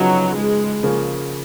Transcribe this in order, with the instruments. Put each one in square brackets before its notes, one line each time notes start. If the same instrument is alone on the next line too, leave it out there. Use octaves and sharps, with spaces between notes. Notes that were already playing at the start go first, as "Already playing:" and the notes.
Already playing: [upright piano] C#3 F3 B3 D#4 F#4 [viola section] F#3
[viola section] G#3
[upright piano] C#3 F3 A#3 C#4